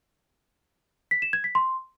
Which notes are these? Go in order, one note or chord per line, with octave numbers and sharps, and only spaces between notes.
B6
E7
G#6
B6
C6